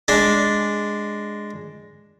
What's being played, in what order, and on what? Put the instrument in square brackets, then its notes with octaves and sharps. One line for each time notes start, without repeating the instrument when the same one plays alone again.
[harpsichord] G#3 D4